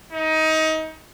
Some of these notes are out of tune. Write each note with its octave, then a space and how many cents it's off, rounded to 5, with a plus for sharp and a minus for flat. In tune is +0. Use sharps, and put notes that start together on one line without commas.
D#4 +25